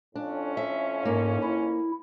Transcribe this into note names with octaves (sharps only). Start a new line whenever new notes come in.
F2 A2 C#4 D4
E5
G#2 A#3
E4